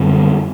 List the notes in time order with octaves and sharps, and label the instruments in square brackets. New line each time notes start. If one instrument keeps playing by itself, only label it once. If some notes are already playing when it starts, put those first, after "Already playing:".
Already playing: [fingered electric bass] F#2 D3 G3 C4